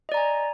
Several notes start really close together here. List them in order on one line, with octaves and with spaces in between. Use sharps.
D#5 D5 A#5 G#5